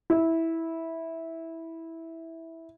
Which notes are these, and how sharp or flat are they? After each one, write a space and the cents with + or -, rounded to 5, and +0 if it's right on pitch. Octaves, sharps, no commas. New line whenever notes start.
E4 -10